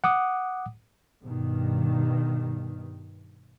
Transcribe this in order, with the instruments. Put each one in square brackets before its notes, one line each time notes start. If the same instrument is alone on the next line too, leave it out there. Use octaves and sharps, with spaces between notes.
[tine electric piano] F#5 D6 D#6
[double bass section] G2 B2 D#3